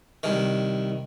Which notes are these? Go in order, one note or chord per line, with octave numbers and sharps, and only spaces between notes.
C2 D#3